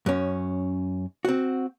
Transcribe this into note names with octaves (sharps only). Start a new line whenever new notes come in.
F#2 C#4
C4 F#4